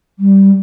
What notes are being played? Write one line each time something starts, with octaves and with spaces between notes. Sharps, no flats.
G3